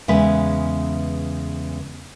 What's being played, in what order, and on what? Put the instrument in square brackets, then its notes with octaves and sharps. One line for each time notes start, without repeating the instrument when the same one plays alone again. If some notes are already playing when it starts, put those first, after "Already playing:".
[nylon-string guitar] E2 C#3 G#3 B3 B4 E5